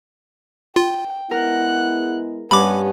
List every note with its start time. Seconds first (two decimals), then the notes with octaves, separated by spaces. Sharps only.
0.76 F4 G5
1.31 G#3 B3 E4 A#4 F#5 F#6
2.51 G2 B3 C#4 B5 D6